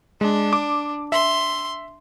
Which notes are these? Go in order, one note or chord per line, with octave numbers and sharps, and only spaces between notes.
G#3 D4
D6
E5 C6